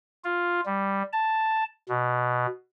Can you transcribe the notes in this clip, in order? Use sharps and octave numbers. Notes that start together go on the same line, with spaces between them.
F4
G3
A5
B2